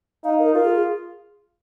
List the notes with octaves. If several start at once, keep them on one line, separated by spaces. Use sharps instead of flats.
D#4 F5
A#4
F4 A#4
G#4
G#4